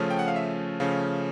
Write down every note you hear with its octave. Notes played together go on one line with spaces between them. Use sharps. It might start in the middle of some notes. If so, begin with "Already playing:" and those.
Already playing: C#3 F3 A3 C#4
G5
F#5
F5
E5
C#3 F3 A3 C#4 F5